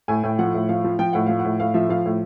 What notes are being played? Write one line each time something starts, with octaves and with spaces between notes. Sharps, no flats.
A2 G#5
A2 G5
F3 F#5
A2
F3 F5
F3
F3 G5
A2 F#5
F3 F5
F#5
A2
A2 F5
F3 E5
F3 F5
A2